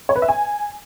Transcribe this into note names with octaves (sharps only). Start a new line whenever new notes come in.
C#5
B4
E5
G#5